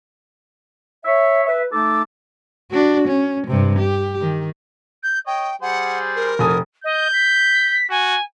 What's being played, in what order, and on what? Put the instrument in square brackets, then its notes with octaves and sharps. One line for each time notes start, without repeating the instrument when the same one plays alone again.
[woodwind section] C#5 E5
B4 E5
A3 D#4 A4 D6
[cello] D4 F#4
C#4
G2 C3
G4
D#3
[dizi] G6
[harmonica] C#5 D#5 [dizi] G5
[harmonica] G3 G#4 C5 [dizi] F#5
[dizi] A#4
[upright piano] F1 D#6 [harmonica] E3 G#5 A5
[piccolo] D#5 [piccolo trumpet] G6
[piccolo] B6
[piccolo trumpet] F#4 [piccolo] G#5